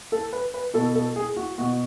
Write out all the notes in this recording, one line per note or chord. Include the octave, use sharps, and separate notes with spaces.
A4
B4
B4
B2 A4
A4
G#4
F#4
B2 F#4